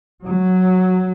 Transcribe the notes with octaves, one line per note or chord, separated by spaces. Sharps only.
F#3